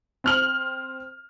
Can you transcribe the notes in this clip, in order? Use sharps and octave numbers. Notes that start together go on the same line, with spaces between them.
C4 F6 F#7